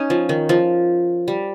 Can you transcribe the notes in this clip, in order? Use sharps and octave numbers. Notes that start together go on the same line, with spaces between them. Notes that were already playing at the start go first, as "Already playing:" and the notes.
Already playing: C#4 D#4
F3
D#3
F3
G3